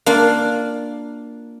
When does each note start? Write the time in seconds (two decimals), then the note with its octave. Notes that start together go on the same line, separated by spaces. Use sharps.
0.06 A#3 D4 F4